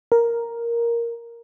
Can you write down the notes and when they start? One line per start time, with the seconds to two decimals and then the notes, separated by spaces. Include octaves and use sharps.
0.12 A#4